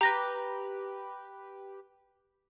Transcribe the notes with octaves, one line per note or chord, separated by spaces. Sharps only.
G4 B4 A#5 A#6